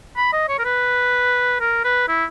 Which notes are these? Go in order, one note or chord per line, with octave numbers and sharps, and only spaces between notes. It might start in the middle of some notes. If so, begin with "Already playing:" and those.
B5
D#5
C#5
A#4
B4
A#4
B4
E4